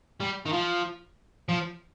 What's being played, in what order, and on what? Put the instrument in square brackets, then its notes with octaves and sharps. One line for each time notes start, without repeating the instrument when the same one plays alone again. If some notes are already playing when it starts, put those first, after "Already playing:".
[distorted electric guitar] G3
D#3
F3
F3